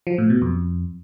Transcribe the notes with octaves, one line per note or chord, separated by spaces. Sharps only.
F3
A2
B2
F2